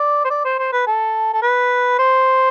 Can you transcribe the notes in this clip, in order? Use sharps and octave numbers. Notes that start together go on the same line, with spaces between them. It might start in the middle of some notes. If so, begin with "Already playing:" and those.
Already playing: D5
C5
D5
C5
C5
B4
A4
A4
B4
C5